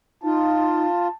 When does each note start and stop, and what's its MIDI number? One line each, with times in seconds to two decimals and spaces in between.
0.24 0.87 63
0.24 1.08 65
0.24 1.14 81